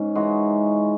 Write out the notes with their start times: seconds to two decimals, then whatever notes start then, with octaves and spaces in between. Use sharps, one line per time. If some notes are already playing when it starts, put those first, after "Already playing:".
Already playing: G#2 C#4 G#4
0.15 E3 G#3 D#4 F#4